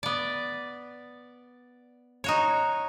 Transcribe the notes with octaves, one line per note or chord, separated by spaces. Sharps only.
B3 D5
D#4 F#4 C#5